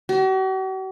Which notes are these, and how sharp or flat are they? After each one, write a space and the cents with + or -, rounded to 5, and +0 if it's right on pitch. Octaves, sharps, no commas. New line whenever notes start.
F#4 +45